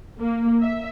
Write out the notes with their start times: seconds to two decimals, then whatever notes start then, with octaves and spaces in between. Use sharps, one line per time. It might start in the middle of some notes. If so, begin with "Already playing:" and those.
0.19 A#3
0.61 E5